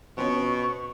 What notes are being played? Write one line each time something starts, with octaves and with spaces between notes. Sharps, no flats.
B2 F3 C4 C#4 C#6